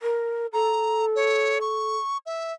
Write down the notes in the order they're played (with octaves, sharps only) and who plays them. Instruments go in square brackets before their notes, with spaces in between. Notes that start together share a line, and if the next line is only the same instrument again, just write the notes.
[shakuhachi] A#4
[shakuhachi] A4 [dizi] A#5
[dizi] C#5
C#6
E5